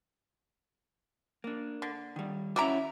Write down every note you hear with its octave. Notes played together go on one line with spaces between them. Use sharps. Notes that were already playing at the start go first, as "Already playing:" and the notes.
A#3 D4
D3
D#3 G3
C#4 E4 F#4 D5 E5 A#5